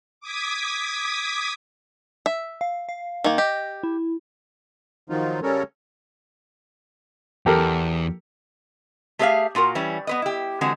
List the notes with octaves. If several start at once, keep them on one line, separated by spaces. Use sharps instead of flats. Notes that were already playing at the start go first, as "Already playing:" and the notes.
D6 D#6 G#6 B6
E5
F5
F5
D#3 A#3
G4 D#5
E4
D#3 F3 F#3 D#4 F4
C#3 G3 C#4 A4 A#4 C#5
E2 G4 A4 A#4
A3 G4 G#4 D5 E5 F5
A#2 F4 F#4 A#4
E3 G3 C#4
B3 B4 D#5
E4 G4
D3 E3 G#3 C4 F#4